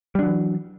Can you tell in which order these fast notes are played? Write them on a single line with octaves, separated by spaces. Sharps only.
G3 D4 F#3 E3